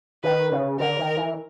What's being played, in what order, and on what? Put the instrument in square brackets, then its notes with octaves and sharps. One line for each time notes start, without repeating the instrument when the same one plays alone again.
[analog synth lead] D#3 [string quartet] B4
[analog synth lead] C#3
[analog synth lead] D3 [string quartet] A#4
[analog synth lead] D#3
E3